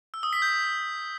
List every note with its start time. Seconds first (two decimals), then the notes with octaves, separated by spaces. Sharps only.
0.14 E6
0.23 D#6
0.33 B6
0.42 G6